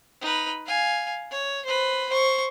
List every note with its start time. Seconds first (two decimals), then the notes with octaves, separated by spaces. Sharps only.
0.22 D#4 B4
0.66 F5 G#5
1.31 C#5
1.65 B4 C5
2.09 C5 C#6